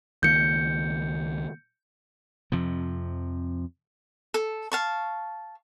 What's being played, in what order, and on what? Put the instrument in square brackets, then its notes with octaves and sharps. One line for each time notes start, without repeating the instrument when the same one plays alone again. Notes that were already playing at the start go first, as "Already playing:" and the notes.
[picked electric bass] C#2 D#3 A#3 [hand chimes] G6 C#7
[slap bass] F2 C3 F3
[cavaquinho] A4
F5 A5 C#6